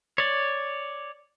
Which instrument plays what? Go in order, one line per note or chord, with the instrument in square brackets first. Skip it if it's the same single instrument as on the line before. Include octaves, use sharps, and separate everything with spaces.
[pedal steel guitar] C#5 D5